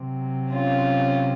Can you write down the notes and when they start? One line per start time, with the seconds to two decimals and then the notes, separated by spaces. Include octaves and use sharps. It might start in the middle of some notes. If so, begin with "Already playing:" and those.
Already playing: C3 F#3
0.52 C#4 F4